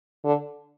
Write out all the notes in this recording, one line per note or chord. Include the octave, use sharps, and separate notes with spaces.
D3